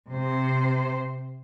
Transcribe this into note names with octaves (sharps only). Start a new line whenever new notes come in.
C3 C5